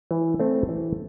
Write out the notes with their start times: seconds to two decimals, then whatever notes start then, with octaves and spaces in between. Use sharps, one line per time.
0.11 E3
0.40 A3 C4
0.69 E3